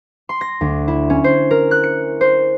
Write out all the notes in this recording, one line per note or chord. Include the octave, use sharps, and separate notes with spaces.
C6
A#6
D2
E4
C#4
C5
A#4
F#6
C#7
C5